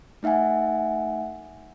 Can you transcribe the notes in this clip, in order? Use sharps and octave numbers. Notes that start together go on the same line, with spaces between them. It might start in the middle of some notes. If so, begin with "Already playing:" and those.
A3 D#4 E5 F#5 G#5